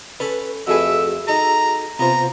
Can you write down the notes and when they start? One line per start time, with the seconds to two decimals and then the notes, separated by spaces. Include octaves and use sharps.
0.20 C#4 A4 B4 B5
0.67 F2 A3 F#4 G#4 B4 E5
1.28 D#4 A4 A#5
1.99 C3 B3 F4 C5 A#5